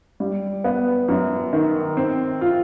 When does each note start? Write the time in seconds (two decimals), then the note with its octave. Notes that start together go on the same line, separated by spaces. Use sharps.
0.20 G3
0.64 B3
1.08 F#2
1.53 D#3
1.97 C4
2.41 F4